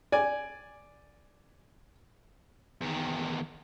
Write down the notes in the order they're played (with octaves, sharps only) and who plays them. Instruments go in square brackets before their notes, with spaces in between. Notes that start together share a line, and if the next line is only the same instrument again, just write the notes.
[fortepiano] D5 G#5
[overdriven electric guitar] E2 D#3